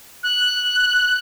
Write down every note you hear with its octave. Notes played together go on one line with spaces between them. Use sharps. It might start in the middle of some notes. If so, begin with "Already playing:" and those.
F#6